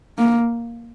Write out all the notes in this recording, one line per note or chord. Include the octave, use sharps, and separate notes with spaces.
A#3